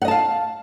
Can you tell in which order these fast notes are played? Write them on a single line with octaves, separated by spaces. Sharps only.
F#5 D#5 A5 F5